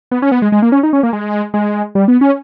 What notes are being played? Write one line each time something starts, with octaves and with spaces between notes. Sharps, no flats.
B3
C#4
B3
G#3
G#3
A#3
C#4
D#4
C#4
A#3
G#3
G#3
G3
B3
C#4